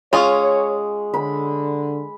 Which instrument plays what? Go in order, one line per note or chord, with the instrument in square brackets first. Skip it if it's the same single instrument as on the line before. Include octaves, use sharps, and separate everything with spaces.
[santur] G#3 [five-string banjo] C#4 F4 [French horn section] C#5
[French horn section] D3 [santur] B5